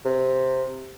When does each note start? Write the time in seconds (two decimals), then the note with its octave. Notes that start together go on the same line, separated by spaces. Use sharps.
0.05 C3